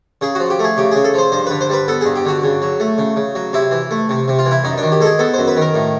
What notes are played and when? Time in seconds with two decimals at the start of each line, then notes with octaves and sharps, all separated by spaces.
0.21 C#3 G#4
0.35 F3 F#4
0.50 G4
0.59 A3 G#4
0.77 C#3 G4
0.91 C#3 G#4
1.04 A4
1.14 F3 C5
1.32 G2 C5
1.47 D3 B4
1.61 C5
1.70 G3 B4
1.88 B3 A4
2.01 G2 G#4
2.16 G4
2.25 D3 F#4
2.43 C#3
2.62 F#3
2.80 A3
2.98 C#3
3.16 C#3
3.35 F#3
3.53 C3 E4
3.71 E3
3.91 A3
4.09 C3
4.28 C3
4.39 F4
4.46 E3
4.51 E4
4.64 F#2 D#4
4.78 D#3 D4
4.92 G4
5.01 G#3 A4
5.06 G#4
5.19 B3 A4
5.34 F#2 C5
5.47 B4
5.56 D#3
5.61 A#4
5.74 A2